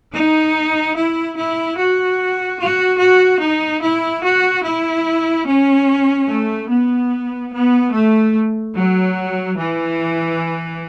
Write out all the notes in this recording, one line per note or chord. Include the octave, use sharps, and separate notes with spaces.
D#4
E4
E4
F#4
F#4
F#4
D#4
E4
F#4
E4
C#4
A3
B3
B3
A3
F#3
E3